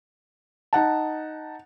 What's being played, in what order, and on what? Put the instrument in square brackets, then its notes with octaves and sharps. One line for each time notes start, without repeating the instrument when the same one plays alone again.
[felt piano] D#4 F#5 A5